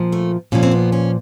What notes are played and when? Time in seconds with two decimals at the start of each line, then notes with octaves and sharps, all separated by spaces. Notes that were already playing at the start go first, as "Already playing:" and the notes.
Already playing: A#2 F3
0.12 A3
0.52 A#2 F3 C#4
0.63 C4
0.71 B3
0.92 C#4